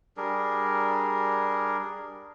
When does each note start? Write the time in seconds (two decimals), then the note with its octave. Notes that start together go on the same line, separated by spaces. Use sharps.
0.17 G3 D4 G#4 A#4